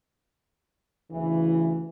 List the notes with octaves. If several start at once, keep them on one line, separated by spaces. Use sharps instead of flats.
D2 C#3 E3